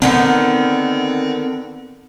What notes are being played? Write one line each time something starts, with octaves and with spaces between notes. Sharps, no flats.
D3 D#3 B3 C4